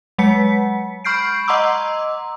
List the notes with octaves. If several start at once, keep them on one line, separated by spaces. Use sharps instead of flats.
F#3 G#3 F#5 B6 C#7
B5 C#6 F6 G6 C7 D7
D#5 F#5 A#5 C6 D6 E6